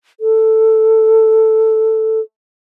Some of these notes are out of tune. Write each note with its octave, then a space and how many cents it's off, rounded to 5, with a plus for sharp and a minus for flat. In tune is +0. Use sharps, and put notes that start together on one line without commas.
A4 +5